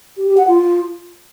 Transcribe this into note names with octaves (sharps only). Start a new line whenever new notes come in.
G4
G4
F#5
F4